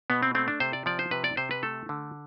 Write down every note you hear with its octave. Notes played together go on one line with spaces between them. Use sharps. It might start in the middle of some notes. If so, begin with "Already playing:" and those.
B2 B3
C4
A3 C4
D4
C3 C5
D5
F3 D5
C5
C3 B4
D5
C3 C5
B4
A3 A4
D3